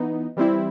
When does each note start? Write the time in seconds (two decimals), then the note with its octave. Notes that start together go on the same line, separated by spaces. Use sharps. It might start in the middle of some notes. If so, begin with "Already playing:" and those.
Already playing: E3 B3 D#4
0.37 E3 G3 C4 E4